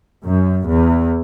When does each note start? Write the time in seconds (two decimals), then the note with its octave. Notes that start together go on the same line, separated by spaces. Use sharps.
0.23 F#2
0.66 E2